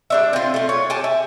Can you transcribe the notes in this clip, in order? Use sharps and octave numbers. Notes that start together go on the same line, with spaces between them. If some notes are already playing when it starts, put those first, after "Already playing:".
G3 D4 E5
C4 F4
A3 F4
C#5
G4 G#5 A5
E5